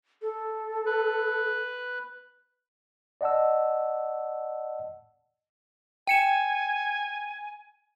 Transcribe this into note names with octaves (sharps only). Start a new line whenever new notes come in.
A4
B4
D5 D#5 F#5 A5 E6
G5 G#5 C#7 E7